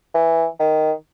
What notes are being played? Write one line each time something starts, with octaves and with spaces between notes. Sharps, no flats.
E3
D#3